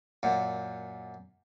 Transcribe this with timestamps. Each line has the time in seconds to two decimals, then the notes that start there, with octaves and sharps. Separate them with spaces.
0.23 F#2 A#2